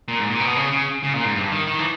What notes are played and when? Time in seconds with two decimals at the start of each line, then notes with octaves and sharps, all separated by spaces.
0.08 A#2
0.19 G#2
0.30 A#2
0.40 B2
0.56 C#3
0.72 C#3
1.04 C#3
1.15 A#2
1.25 G#2
1.35 G2
1.52 D#3
1.67 D#3
1.79 E3